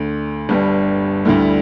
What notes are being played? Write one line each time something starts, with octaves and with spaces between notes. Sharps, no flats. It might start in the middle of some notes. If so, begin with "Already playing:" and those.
Already playing: D2 D3 A3
G1 G2 G3
D2 D3 G3 E4